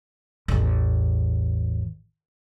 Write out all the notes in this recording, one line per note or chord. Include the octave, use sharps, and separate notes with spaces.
A1 E2